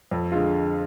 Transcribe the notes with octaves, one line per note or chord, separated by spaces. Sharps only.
F2
D3 G#3 F4